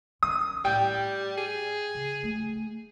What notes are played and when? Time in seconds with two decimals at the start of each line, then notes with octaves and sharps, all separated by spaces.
0.23 D#3 C#4 D#6
0.65 A2 G3 G5
1.37 G#4
1.95 C#3
2.23 A3